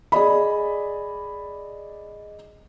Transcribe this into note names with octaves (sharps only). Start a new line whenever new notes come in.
G#4 D5 D#5 B5